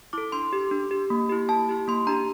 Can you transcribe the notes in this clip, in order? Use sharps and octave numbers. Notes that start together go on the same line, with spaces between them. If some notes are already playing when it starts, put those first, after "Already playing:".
E4 A4 D6
D4 C6
G4
D4
G4
A#3
E4 G4
A#3 A5
E4 G4
A#3 C6
D4 G4 A#5